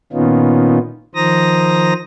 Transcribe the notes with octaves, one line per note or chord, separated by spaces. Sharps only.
A#2 D#3 B3 C#4 D#4 F4
D#3 F3 C5 A#5 D#6 A#6